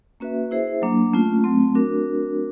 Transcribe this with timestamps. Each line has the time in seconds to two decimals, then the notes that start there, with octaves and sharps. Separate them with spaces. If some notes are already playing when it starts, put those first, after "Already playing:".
0.20 A#3 C#4 F#4 B4 E5
0.51 E4 G#4 C5 E5
0.82 F#3 A#3 D4
1.13 A3 C#4 F4
1.44 F#3 A3 C4
1.75 D4 F#4 A#4